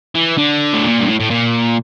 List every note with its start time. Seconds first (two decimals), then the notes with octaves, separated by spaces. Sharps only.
0.15 E3
0.38 D3
0.73 A2
0.84 A#2
1.00 G2
1.08 A2
1.20 A2
1.30 A#2